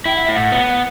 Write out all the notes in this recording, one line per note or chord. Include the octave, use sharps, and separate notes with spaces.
E4 G5
F#5
E5
A2 F#5
B3